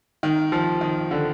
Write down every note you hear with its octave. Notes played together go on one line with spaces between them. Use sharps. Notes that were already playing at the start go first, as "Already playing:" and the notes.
D#3
F3
D#3
D3